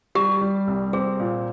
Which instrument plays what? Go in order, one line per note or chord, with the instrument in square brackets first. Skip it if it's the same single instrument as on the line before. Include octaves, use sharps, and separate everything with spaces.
[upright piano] G3 [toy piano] G4
[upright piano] G3
C2
[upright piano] C4 [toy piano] G#4
[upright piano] A#2